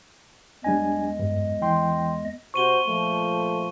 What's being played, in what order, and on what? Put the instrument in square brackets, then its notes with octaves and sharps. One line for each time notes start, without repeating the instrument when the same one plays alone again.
[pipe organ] E2 G#3 D#5 [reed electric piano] G3 D4 G#5
[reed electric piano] G2
E3 G5 C6
[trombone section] C3 F#4 C5 [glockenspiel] C#6 D#7 G7
[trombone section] A#2 F3 A3